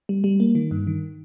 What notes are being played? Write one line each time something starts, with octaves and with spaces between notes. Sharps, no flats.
G3
G3
A#3
D#3
G2
D#3